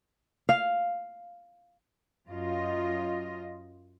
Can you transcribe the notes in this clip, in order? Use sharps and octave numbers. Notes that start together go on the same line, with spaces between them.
F5
F#2 F4 D#5